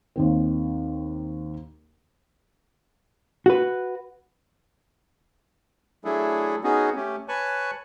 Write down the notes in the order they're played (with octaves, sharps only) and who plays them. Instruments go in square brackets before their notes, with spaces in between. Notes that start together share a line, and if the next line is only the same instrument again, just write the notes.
[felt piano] D#2 D#3 C4
[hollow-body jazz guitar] F#4 B4
[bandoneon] F#3 A3 D4 E4 G#4 A4
B3 C#4 D#4 F#4 G#4
A3 C#4 G4
B4 C#5 G#5 A5 C#6 F#6